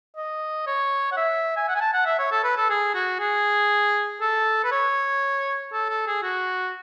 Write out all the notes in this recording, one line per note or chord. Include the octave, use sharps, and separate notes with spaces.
D#5
C#5
F#5
E5
G#5
F#5
G#5
A5
F#5
E5
C#5
A4
B4
A4
G#4
F#4
G#4
A4
B4
C#5
A4
A4
G#4
F#4